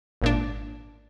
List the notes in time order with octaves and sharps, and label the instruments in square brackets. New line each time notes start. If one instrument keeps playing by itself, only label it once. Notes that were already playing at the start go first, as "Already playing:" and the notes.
[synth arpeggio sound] G#1 A#2 D4